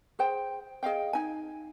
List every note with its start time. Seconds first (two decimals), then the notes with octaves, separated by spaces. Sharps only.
0.19 G#4 C5 G5
0.83 G#4 D#5 F5 G5
1.13 D#4 G#5